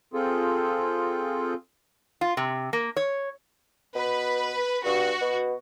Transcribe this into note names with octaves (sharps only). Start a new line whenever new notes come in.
C4 F4 G#4 A4
F4
C3
A#3
C#5
B2 B4
G2 F#4
B2